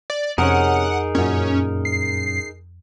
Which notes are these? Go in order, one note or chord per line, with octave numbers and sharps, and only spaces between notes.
D5
F2 C3 C#4 D#4 G#4 A#4 F#5
F#2 A#2 C#4
C7